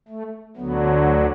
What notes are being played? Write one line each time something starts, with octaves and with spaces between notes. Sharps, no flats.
A3
D2 D3 F#3 B3